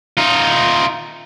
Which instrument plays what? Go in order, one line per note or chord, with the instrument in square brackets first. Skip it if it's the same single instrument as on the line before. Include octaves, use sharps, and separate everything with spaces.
[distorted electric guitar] D#4 F4